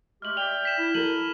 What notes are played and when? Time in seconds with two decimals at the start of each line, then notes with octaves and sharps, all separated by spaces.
0.22 G#3 A3 G4 F6 F#7
0.37 D5 E5 G5 F7 G7
0.65 B6 E7
0.78 E4
0.94 A4 A#4 D#7 F#7